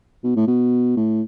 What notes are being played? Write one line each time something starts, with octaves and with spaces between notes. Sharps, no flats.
B2
A2
B2
A2